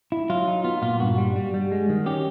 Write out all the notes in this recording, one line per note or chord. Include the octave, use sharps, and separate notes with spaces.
E4
F#3 F4
D#4
B3 F4
A#2 F4
G2 F#4
G3
G3
G3
G#3
D#3
C#4 G4